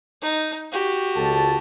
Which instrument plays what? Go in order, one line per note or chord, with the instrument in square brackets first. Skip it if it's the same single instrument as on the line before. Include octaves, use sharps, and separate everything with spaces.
[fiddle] D#4
F#4 G4
[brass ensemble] C#2 A4 A5